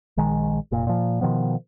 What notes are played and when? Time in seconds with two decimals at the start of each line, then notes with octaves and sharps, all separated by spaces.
0.17 A#1 D#3 G#3
0.72 F1 A#2
0.87 A#2 F3
1.21 B2 D#3 F3 B3